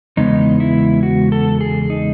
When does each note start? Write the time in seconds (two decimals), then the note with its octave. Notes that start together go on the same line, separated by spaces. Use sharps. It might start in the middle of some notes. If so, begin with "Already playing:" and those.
0.17 E2 C#3 G#3 B3 D#4
0.60 E4
1.03 F#4
1.32 A4
1.61 G#4
1.90 D#4